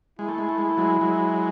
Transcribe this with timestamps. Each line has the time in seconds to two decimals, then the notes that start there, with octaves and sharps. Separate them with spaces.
0.19 G#3 E4
0.29 A3
0.38 G#3
0.49 A3
0.58 G#3
0.69 A3
0.78 F#3 G#3
1.01 F#3 G#3